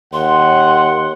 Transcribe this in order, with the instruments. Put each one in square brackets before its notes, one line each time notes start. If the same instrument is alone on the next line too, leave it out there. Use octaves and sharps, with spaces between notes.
[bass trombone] D#2 [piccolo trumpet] F#5 [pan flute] C6